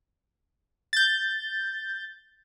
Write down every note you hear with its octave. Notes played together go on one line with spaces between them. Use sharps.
G6 A6